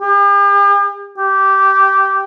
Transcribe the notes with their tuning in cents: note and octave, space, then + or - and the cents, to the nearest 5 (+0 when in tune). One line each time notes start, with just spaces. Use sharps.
G4 +45
G4 -15